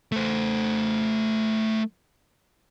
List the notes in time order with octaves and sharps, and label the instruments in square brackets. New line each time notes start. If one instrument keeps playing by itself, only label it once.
[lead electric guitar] A3 C5